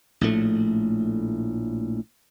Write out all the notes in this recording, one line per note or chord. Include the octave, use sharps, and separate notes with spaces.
A#1 A2 A3